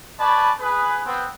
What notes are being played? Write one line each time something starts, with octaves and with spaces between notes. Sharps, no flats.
B4 C#5 D5 G#5 A5 B5
G#4 B4
B3 C4